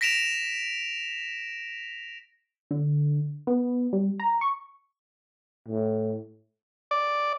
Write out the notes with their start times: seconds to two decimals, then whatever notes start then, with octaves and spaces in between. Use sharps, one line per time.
0.01 A#6 B6 D7 E7 F7
2.71 D3
3.47 B3
3.93 G3
4.20 A#5
4.41 C#6
5.68 A2
6.91 D5